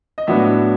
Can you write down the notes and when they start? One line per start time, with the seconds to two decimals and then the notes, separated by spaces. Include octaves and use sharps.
0.18 D#5
0.27 A2 F#3 B3 D4 E5